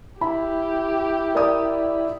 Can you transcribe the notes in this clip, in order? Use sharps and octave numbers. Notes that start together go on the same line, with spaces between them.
E4 G4 B5
A#4 D5 D#6